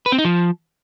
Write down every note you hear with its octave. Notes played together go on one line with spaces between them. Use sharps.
B4
C4
D#4
F3